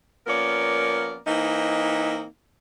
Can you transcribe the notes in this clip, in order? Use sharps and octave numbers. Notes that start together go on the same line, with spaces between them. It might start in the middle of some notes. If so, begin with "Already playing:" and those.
F3 A#3 B3 C#4 A#4 D5
E3 A#3 C4 D#4